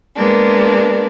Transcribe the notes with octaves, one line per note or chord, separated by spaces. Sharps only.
G#3 A#3 B3 D4